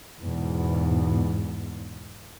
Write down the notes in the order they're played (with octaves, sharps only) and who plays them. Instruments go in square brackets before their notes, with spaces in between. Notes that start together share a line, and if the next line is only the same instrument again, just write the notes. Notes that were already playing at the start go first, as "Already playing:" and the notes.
[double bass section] E2 G#2 B2